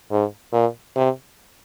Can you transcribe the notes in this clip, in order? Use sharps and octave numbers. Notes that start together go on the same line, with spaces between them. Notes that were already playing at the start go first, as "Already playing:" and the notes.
G#2
A#2
C3